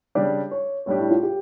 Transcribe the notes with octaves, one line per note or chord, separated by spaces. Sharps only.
C#3 G3 D4 G4 D5
C#5
A2 G3 D4 G4 C#5
E4
F4
G4